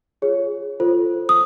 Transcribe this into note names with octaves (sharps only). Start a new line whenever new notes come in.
F4 G#4 C#5
F4 A4 C5
D#6